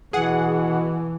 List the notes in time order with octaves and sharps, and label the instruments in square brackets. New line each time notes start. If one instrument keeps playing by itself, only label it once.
[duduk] B2 [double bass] E3 [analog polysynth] G#4 F#5